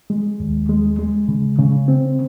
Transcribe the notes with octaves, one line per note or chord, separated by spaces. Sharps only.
G#3
D#2
G#3
G#3
C#3
C#3
C4